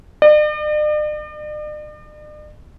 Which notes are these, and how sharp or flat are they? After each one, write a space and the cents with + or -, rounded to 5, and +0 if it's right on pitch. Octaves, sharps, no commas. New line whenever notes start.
D5 +45